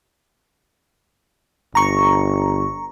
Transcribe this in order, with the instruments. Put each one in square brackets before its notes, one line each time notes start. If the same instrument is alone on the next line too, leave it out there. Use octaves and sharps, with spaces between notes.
[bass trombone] G1 [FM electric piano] A#5 C#6